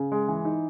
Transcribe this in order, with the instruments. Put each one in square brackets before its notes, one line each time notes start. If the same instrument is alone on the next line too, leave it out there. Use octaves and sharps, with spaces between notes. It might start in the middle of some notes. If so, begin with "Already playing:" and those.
Already playing: [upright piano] C#3
G#3
E3
D#4